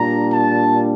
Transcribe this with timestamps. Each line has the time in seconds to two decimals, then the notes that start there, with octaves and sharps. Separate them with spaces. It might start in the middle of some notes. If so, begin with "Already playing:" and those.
Already playing: A#2 G3 D4 A#5
0.33 A5